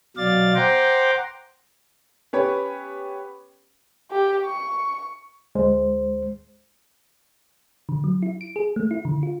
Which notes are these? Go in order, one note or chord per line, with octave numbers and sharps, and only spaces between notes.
B2 F#3 D5 F5 A6
C5 F#5 G5 A#5 C6 D6
B3 C#4 G4 B4 C#5
G4
C#6
D2 G#3 C5
D3
F#3
E4
D7
G#4
A3
E4
D3
F4